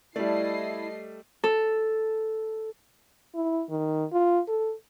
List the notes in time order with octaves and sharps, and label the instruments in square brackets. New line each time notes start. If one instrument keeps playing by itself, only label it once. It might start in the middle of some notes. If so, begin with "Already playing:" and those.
[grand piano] G3 A3 [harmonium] E4 [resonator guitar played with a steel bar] D5 [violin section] D#5 A5 C7
[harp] A4
[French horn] E4
D#3
F4
A4